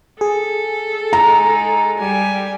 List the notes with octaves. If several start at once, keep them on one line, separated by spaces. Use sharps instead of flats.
G#4 A4
G#3 D#4 A#5
G3 G#5